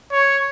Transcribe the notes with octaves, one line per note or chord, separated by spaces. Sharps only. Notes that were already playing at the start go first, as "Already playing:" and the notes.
C#5